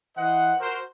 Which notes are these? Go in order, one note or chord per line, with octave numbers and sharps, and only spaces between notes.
E3 C5 D#5 F#5
F#4 A#4 C5